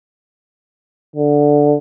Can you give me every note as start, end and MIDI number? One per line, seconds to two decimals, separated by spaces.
1.16 1.77 50